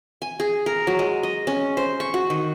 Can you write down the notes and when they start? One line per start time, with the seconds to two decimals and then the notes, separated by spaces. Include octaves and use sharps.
0.22 G#5
0.40 G#4
0.66 A#4
0.87 F#3
0.99 G#3
1.23 D#5
1.47 C#4
1.77 C5
2.00 C#6
2.14 F#4
2.30 D#3